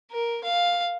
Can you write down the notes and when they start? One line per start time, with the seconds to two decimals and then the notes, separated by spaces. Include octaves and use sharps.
0.12 A#4
0.44 F5